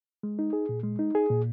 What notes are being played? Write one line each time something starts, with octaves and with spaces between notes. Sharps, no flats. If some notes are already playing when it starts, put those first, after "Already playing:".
G#3
D#4
G#4
A#2
G#3
D#4
G#4
A#2